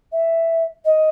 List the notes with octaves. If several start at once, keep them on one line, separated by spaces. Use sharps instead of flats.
E5
D#5